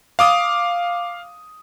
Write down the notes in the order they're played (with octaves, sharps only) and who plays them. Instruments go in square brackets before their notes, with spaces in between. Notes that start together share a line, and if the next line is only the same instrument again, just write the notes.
[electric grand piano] F5 D6 D#6